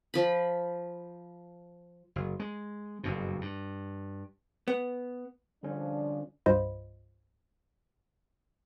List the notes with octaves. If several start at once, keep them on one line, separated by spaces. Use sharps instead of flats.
F3 B5
F#1
G#3
F#1 G2 B2
G2
B3
D3 F3 G3 C#4 D4
C2 G2 F4 C5 D#5 B5